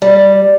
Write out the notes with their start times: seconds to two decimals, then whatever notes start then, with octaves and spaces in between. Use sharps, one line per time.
0.02 G3